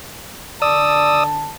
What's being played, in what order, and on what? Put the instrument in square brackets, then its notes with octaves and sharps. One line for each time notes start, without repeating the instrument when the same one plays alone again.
[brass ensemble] D3 A5 [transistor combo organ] D5 D#6 E6